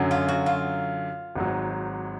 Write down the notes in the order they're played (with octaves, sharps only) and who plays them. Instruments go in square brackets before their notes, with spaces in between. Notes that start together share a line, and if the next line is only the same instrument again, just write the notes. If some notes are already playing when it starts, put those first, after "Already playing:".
Already playing: [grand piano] F#2 D3 F#3
[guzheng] F4
F#4
F4
[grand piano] G#1 G#2 F#3